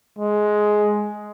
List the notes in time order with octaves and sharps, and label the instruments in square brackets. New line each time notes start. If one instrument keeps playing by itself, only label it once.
[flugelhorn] G#3